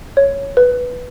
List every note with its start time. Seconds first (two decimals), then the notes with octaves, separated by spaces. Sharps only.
0.17 C#5
0.57 B4